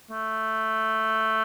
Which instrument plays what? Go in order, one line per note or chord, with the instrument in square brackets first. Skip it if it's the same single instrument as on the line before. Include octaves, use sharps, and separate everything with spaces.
[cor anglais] A3